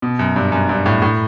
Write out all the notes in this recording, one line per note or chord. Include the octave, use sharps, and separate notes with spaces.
B2
F#2
G2
F#2
G2
A2
A2